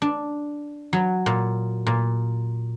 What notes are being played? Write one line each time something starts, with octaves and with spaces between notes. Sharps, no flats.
D4
F#3
A#2
A#2